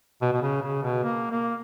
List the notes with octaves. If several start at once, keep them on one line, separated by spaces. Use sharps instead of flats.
B2
B2
C#3
C#3
B2
A#3
A#3